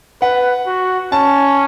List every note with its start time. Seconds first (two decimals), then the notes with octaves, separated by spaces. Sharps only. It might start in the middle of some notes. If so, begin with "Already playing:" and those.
0.21 B4 F#5
0.66 F#4
1.12 C#4 A5